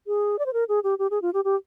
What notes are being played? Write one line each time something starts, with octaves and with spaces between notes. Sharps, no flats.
G#4
D5
C5
A#4
G#4
G4
G4
G#4
F4
G4
G4